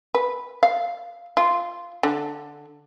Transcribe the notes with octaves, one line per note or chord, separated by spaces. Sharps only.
B4
F5
F4
D3